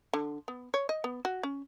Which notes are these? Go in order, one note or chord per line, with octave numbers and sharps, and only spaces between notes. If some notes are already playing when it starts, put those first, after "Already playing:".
D3
B3
C#5
D#5
B3
F#4
C#4